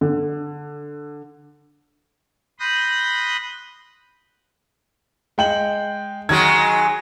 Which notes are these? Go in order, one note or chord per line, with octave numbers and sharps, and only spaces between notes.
D3
B5 C6 D#6 F#6 G6 A#6
G#3 G5 F#7
D#3 F#3 G#3 G#6